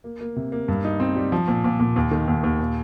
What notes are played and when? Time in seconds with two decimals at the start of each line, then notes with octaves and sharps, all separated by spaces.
0.04 A#3
0.21 A#3
0.36 C3
0.52 A#3
0.68 G2
0.84 D#4
1.00 C4
1.16 G3
1.32 F3
1.48 A#2
1.64 A#2
1.80 A#2
1.96 D#2
2.11 D#3
2.28 D#2
2.44 D#2
2.59 A#2